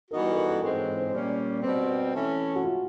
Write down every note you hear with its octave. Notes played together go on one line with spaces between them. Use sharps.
E3 G3 B3 D#4 F#4 A#4
B4
A4
A#4
A4
G#2 E3 G#3 C4 A#4
C#5
C5
A#2 G3 A#3 C#4
B2 G3 C4 B4
E3 A3 C#4
F#4
F4